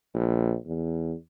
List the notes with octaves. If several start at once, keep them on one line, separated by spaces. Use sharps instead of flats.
A#1
E2